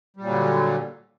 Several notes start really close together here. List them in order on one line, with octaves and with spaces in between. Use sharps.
G3 A#2 F#3 D3